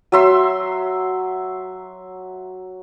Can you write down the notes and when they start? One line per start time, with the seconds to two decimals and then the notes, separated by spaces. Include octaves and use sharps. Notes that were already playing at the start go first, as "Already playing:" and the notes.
0.12 F#3 E5 C6